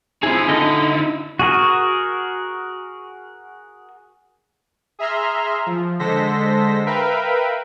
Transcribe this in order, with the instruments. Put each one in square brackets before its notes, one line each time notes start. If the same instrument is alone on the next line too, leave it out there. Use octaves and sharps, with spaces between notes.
[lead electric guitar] C4 G#4 [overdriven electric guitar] D#4 E4
[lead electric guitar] D3 D#5
[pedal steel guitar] F#4 G#4 A#4
[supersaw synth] G#4 E5 A#5 C6 F6
F3
D3 G#3 A4 C5 A#6 B6
A#4 B4 E5 F5 G5 B5